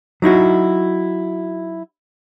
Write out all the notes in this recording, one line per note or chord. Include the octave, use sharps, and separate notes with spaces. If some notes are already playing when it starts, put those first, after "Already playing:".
F#3 D#4 E4 F#4